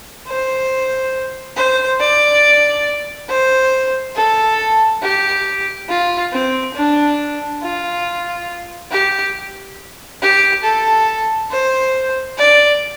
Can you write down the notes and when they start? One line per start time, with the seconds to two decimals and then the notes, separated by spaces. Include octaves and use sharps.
0.27 C5
1.56 C5
1.99 D5
3.29 C5
4.15 A4
5.02 G4
5.89 F4
6.33 C4
6.75 D4
7.62 F4
8.91 G4
10.22 G4
10.64 A4
11.51 C5
12.38 D5